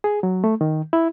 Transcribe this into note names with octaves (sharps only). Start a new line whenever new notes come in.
G#4
F#3
A3
D#3
E4